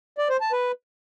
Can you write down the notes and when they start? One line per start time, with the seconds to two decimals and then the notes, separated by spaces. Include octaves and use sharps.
0.18 D5
0.29 C5
0.41 A5
0.52 B4